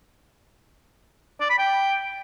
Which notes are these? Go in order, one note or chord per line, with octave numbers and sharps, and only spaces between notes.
D5
B5
G5